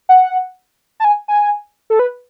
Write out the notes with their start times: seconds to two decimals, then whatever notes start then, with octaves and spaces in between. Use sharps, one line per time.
0.09 F#5
1.00 A5
1.05 G#5
1.28 G#5
1.90 A4
1.99 B4